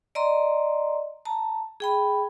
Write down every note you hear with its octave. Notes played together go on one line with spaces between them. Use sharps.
D5 D#5 A#5 C6
A5 A#5
G#4 G5 B5